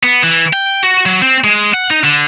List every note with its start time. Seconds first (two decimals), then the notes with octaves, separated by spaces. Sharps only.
0.03 B3
0.23 E3
0.53 G5
0.83 F#4
1.06 F#3
1.22 C4
1.44 G#3
1.74 F#5
1.90 D#4
2.04 D3